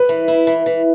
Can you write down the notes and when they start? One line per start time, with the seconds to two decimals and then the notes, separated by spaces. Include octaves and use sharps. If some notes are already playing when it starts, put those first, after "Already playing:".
Already playing: B4
0.09 E3
0.28 E4
0.47 E3
0.66 E3